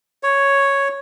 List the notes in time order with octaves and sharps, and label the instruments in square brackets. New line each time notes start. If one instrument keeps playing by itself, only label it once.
[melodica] C#5